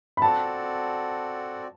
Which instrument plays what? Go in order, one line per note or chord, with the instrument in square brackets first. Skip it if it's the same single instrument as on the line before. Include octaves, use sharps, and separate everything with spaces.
[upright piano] B5
[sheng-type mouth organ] C4 F#4 A4 D5 F#5 [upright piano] A5